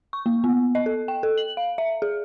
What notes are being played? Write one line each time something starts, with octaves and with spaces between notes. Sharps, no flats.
C#6
A#3
B3
D#5
A4
G5
A4
F#7
F5
E5
G#4